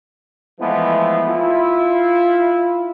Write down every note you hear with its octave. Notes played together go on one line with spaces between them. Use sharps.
E3 F3 G#3 A3 B3 E4
E4 F4